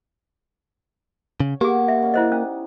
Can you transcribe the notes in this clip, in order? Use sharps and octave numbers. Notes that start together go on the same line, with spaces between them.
C#3 C#5
A#3 B3 G4 G#4 E5 E6
G#3 E5 F#5
C#4 C#5 D5
E4 C5 D#5
C#4 D#4 D#6